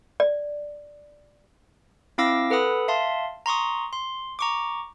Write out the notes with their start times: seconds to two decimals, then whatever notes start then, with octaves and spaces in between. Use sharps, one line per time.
0.20 D5
2.18 C4 E4 F5 D6 E6 A#6
2.50 A4 B4 F#5 B5 D#6
2.88 E5 F5 A5 C6
3.46 A#5 C6 C#6 D#6
3.93 C6
4.39 A#5 C#6 D6